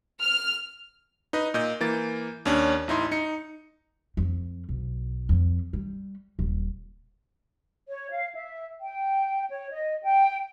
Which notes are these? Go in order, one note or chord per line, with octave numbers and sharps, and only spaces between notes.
F6
D#4 B4 D#5
A#2 D#5 G6
E3 A#3 A6
D#2 C#4 D4
A1 D#4 E4 C6
D#4 C#7
F2
B1
F2
G3
D#1
C#5
F5
E5
G5
C#5
D#5
G5